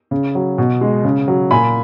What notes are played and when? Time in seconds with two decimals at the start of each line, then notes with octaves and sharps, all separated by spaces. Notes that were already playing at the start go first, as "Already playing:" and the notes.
0.11 C#3
0.35 F#3
0.58 B2
0.81 G#3
1.04 C#3
1.28 F#3
1.51 A#2 G#5 B5